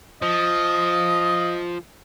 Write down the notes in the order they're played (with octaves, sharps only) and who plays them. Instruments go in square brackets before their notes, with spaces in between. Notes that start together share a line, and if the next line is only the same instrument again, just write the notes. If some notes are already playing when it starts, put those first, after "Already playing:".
[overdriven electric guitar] F3 [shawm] D#5